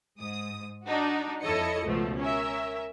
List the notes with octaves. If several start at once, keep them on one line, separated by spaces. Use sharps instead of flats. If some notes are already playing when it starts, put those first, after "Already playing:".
G#2 D#6
D4 D#4 F#4
F2 E4 A4 C#5 D#5 C#7
C#2 B2 F3 A3
C#4 A#4 E5